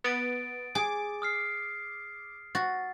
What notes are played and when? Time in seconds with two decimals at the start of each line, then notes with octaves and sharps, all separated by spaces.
0.04 B3 D#6 A6 D7
0.75 G#4 D6
1.22 D#6 F6 C7
2.55 F#4 A6